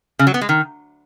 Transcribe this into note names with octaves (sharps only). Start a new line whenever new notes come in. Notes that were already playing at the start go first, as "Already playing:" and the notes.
C#3
F#3
B3
G#3
D#3